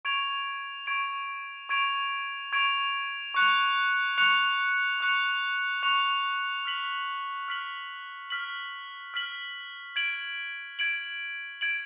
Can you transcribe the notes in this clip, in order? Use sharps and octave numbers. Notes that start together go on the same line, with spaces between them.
C#6 G#6 D7 F7
C#6 G#6 D7 F7
C#6 G#6 D7 F7
C#6 G#6 D7 F7
C#6 F#6 C#7 F7
C#6 F#6 C#7 F7
C#6 F#6 C#7 F7
C#6 F#6 C#7 F7
F6 B6 F#7
F6 B6 F#7
F6 B6 F#7
F6 B6 F#7
G#6 D7 F#7
G#6 D7 F#7
G#6 D7 F#7